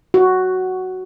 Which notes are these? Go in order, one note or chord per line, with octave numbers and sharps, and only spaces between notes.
F#4